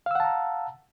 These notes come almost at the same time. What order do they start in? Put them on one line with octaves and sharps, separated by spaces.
F5 E6 F#5 A5 A#5